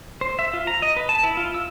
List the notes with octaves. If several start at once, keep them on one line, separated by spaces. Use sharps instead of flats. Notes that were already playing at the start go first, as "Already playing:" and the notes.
C5
E5
F4
A#5
D#5
B4
A5
E4
F4
E6